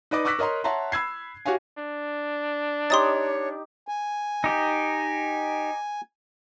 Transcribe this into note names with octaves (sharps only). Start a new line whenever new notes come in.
D#4 B4 D5 D#5 D6
C#6 D6 E6 F#6 A#6 B6
A#4 C#5 D#5 A#5 C6
C#5 E5 F#5 A5 A#5 C6
B5 E6 G#6 C7
F#4 G4 C#5 F5 G#5
D4
D#4 G4 C#5 C6 D#6 A6
G#5
D#4 G4